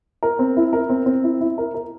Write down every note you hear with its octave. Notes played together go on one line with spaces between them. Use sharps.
A#4
C4
E4
A#4
C4
C4
E4
E4
A#4
A#4